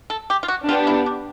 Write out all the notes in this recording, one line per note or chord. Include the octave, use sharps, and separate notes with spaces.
A4
G4
F4
F#4
B3 D4 F4 G4
E4
D4